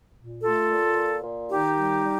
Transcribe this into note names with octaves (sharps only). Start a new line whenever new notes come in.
A#2
A3 F4 A4
A#2
A#2
A#2
D#3 D#4 G4
G3
G3